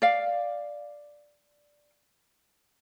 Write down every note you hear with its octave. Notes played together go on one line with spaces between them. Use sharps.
D5 F5